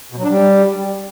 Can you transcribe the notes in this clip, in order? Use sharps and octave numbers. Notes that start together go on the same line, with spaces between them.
B2
F#3
D4
G3